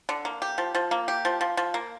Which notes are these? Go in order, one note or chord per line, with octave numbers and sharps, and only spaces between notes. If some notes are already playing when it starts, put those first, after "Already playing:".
D3
A#3
G4
F3
F3
A#3
G4
F3
F3
F3
A#3